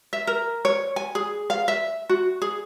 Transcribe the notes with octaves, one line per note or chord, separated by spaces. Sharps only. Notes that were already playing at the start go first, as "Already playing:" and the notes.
E5
A#4
C#5
G#5
G#4
F5
E5
F#4
G#4